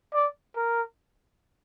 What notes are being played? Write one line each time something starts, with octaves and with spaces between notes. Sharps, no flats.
D5
A#4